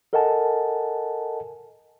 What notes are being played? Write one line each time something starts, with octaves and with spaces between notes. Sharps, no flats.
A4 A#4 D#5 F#5 G#5 A5